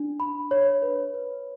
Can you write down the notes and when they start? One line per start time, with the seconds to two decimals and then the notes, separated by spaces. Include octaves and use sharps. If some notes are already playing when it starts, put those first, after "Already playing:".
Already playing: D4
0.20 B5
0.51 C#5
0.82 B4
1.14 B4